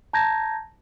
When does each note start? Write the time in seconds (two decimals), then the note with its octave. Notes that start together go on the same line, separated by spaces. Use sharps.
0.13 A5 A#5 G6 G#6 A#6